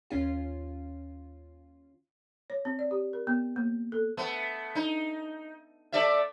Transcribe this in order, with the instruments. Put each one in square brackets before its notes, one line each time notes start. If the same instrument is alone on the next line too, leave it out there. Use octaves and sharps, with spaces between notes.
[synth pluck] D#2 C#4 F4
[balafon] C#5
C4
D5
G4
A#4
B3
A#3
A4
[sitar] A3 B3
D#4
A3 D5 E5